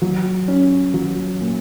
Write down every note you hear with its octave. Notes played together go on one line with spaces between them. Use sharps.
F#3
C#4
F#3
A#2